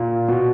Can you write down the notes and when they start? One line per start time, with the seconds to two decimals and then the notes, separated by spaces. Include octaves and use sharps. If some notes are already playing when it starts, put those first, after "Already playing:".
Already playing: A#2
0.28 B2